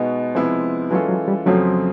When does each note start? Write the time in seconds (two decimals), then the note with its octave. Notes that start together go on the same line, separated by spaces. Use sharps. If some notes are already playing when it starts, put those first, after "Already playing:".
Already playing: B2 G#3 B3 D#4 F#4
0.35 C3 F3 G#3 B3 E4
0.91 E3 F#3 G#3 C#4 F4 A4
1.09 F#3
1.28 G3
1.46 F2 C#3 F3 F#3 A3 C4